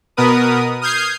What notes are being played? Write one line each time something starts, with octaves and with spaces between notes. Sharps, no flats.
B2 B3 A#4 B4 D#6
D#6 F6 G6 G#6 C7